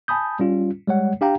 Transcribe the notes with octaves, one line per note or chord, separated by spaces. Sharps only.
G#5 A5 B5 D#6 G6
G3 C#4 F4
G3 G#3 C#5 F#5
D4 G4 F5 G5 A#5